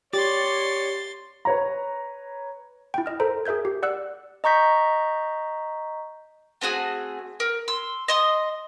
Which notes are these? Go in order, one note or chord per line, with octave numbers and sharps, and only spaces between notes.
G4 C#5 D5 C6 A6
B4 C#5 A#5
E4 G5
D#5 F6
A4 A#4 C5 A#5
G#4 A#4 E5 G6 G#6
G4
D5 F#5 E6 F#6
D#5 A#5 C#6 G6 B6
A3 C4 F#4 G#4
A#4
C6 E6
D#5 C6 D#6